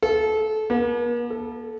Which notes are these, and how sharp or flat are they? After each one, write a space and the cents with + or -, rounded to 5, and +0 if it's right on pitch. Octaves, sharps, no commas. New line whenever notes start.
A4 -25
A#3 +45
A4 -10